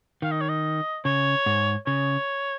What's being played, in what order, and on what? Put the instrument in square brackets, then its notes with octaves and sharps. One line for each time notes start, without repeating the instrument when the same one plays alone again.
[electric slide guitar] D#3 [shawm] F5
[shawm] D#5
C#5
D#5
[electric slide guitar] C#3 [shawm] C#5
[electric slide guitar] G#2
[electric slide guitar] C#3 [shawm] C#5